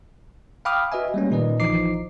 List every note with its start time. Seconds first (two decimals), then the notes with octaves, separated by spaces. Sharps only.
0.65 F5 G5 B5 D6 D#6 F6
0.92 F#4 B4 D#5 E5 G#5
1.14 G3 A3 A#3 C#4
1.31 A#2 D#3 D#4 B4 D5 D#5
1.60 A#1 E3 F3 D#4 D6 C7